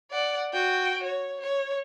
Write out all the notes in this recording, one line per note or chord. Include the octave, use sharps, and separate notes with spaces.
D5 F#5
F#4 G5
C#5
C#5